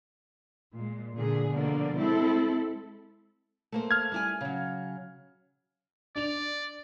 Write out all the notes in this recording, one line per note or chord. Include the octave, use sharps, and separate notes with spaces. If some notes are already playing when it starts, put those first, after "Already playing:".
A#2 G#3
A#2 D3 G#4
B2 D3 F3 A#3 D5
G#3 C4 E4 A4
A3 A#3 C5
F6 G#6
G3 E4 G#5
C#3 F#3
D4 D5 F7